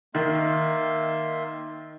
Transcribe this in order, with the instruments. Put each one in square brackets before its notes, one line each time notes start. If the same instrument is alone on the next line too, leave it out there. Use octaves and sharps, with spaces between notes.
[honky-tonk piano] D#3 [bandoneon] A#3 E5 C6